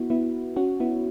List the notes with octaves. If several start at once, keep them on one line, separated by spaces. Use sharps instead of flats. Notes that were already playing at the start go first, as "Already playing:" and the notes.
Already playing: B3 E4 F#4
B3 E4
C#4 F#4
B3 E4